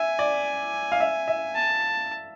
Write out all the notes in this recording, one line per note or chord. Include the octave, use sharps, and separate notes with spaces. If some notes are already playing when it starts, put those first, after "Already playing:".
Already playing: E5 G#5
D5
F5
E5
E5
A5